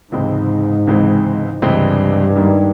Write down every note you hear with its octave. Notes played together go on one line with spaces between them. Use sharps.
C#2 G#2 C3 E3 G#3 C4
C#2 C3 E3 G#3 C4
C#2 G2 C3 E3 G#3 C4
G#2 D#3 G3 A#3